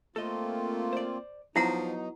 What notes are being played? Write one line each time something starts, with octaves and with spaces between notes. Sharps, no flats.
A3 A#3 C4 F4 A4 D#5
C5 D5
F3 F#3 B3 D#4 E4 F#5 A#5